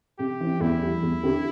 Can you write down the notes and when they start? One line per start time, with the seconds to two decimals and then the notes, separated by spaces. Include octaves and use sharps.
0.19 C3 G4
0.40 E3 C4
0.60 E2 E4
0.82 E3 G3
1.02 E2
1.23 D3 C4 G4